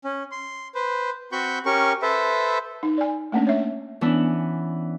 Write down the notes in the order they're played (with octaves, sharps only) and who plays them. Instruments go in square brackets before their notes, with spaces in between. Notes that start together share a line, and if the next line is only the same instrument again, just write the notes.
[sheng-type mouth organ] C#4
C6
B4 C5
C4 F#4 B5 C#6 G6
C#4 G4 A#4 C#6
A4 B4 C5 E5
[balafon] D#4
D5 G#5
A3 A#3 C#4 D4
C#5 E5
[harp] E3 B3 C#4 D4 E4